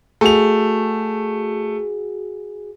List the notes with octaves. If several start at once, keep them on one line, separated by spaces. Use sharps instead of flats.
A3 F#4 G#4 F7